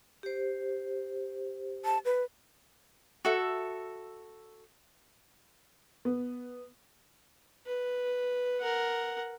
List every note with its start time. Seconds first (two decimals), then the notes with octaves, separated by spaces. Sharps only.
0.23 G4 C5
1.85 A5
2.05 B4
3.25 F#4 A4 E5
6.05 B3
7.66 B4
8.60 A#4 F#5